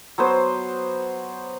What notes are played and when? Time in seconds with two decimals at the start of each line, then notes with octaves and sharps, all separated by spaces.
0.18 F#3 B3 C5